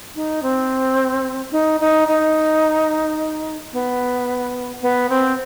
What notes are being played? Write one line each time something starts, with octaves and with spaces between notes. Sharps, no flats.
D#4
C4
D#4
D#4
D#4
B3
B3
C4